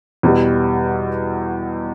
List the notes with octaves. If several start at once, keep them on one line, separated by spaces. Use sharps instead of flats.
E2 B2 G3